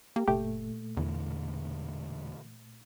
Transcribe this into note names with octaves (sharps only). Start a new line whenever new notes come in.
A#3 G4
F#1 A#2 A3 G4
E1 E2 D3 E3